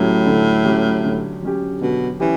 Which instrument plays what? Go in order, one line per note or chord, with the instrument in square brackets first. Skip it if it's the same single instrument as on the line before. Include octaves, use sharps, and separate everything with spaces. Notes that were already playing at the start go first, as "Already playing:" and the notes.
Already playing: [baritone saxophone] A2 [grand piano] F#3 C#4 G4
[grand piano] D3
F#3 C#4 G4
D3
F#3 C#4 G4
[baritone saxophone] B2 [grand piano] D3
[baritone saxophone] E3 [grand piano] C#4 G4